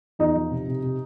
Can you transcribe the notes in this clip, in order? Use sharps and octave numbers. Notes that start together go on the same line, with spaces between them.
E2 D#4
F3
C3
C3
C3